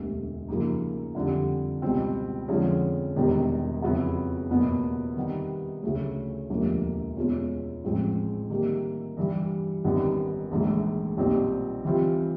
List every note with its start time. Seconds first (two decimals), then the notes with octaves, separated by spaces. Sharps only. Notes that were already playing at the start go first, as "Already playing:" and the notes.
Already playing: E1 D2 C3
0.48 F#2 C#3 F3 A#3 D#4
1.15 F2 D3 G3
1.82 C#2 B2 G3 C4
2.48 F2 D3 F3 G#3 C#4
3.16 E1 E2 C3 D#3 G3
3.82 F2 C#3 F#3 B3 E4
4.50 F#1 E2 B2 F#3 B3
5.16 C3 D#3 G3 B3
5.82 D2 C#3 F#3 A3 C#4
6.50 E1 D2 C3 F3 A#3
7.17 E2 B2 G#3 C#4 F4
7.84 A1 G#2 F3 G#3 C4
8.50 C3 D#3 G3 A#3
9.17 G2 E3 G3
9.84 G#1 F#2 D#3 G3 B3
10.51 A#1 G#2 E3 A3
11.17 B1 A#2 G3 C4
11.85 C3 E3 G3 C4 F4